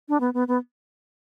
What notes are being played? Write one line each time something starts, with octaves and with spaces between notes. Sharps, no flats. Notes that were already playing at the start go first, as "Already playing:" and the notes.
D4
B3
B3
B3